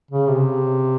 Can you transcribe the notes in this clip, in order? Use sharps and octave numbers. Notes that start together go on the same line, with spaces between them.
C#3
C3